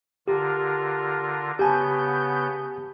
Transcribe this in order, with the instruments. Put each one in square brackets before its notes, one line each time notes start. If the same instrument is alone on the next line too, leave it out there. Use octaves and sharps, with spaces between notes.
[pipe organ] D3 F4 A#4 [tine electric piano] G4
[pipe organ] C#3 B3 G6 [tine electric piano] G4 G#5 A5